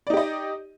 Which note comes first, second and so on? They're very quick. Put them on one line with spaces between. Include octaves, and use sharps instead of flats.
D5 D#4 G4 D#5